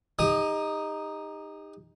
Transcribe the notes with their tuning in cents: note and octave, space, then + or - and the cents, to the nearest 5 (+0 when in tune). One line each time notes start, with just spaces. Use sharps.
D#4 +0 G4 +40 D#6 +5